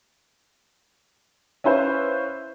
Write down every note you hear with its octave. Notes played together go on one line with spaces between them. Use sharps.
C#4 E4 B4 C5 F5